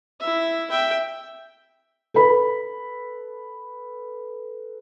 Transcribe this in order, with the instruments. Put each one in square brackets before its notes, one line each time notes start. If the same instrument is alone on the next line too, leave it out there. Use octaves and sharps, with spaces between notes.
[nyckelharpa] E4 E5
E5 G5
[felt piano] A4 B4 B5